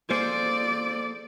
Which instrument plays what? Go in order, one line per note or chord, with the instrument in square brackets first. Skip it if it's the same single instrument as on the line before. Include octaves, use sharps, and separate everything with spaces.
[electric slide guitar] A#3 G#4 A4 [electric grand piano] C5 [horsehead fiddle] D5